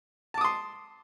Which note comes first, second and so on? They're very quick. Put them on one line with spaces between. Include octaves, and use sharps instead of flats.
A5 D6 D#6 C6